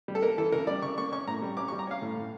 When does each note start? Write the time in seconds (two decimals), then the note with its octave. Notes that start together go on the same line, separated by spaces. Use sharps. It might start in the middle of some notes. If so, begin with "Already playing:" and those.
0.08 G3
0.15 A4
0.23 A#3 A#4
0.38 E3 A4
0.52 C#3 A#4
0.67 G3 D5
0.82 C#3 C#6
0.98 A#3 C#6
1.12 C#4 C#6
1.27 A2 A#5
1.42 G3
1.57 C#4 D6
1.68 C#6
1.72 G3
1.79 A#5
1.87 C#4 F5
2.02 A2
2.17 A2